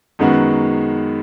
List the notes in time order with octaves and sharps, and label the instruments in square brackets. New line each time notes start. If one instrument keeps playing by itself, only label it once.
[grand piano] F#2 D#3 G#3 B3 F#4